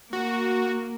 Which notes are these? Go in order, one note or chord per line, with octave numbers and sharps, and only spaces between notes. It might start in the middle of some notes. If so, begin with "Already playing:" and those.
A#3 F#4